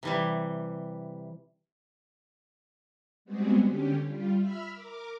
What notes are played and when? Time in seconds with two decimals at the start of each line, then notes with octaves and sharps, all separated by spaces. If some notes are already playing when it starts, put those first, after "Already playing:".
0.03 C3 E3 G3
3.25 G3 G#3 B3 C4 F#4 G#4
3.62 D3 C#4 G4
4.03 G3 F4
4.37 E5 B5 E6 F6
4.71 A#4 D6